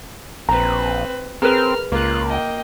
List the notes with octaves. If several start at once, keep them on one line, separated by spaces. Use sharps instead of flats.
A#1 C4 B4 A#5
C4 G#4 A#4 B4 F6
C#2 A#3 F4 F#6
D#5 G5